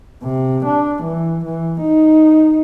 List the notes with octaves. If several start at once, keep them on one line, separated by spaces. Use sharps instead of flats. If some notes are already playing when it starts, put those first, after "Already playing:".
C3
D4
E3
E3
D#4